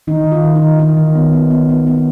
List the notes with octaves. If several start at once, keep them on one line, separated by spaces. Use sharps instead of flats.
D#3 D#4
D#3
F4
D#3
D#4
D#3
D#3 D#4
D#3
B3
B3
B3
B3
B3